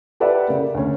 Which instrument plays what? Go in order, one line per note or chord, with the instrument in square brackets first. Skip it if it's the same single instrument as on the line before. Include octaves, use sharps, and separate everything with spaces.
[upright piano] G4 A4 B4 D5 E5 F#5
C#3 A#3
D2 C#4